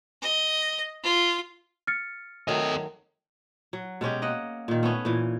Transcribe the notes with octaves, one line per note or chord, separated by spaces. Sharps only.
D#5
F4
F6 A6 C#7
D#3 F#3 A3 A4 D#5
F#3
B2 G#3 C#4 G4
A#3 D#5 F#5
A#2 D#3
A3 B3 C#4
A#2 E3